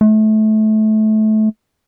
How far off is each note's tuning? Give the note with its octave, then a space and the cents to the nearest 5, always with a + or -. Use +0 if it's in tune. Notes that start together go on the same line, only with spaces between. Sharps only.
A3 -25